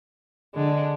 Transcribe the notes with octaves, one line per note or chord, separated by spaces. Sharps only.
D3 G#3 D4